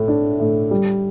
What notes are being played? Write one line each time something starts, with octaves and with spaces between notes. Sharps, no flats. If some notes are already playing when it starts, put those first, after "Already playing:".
Already playing: A2 A3
D4
A2
G3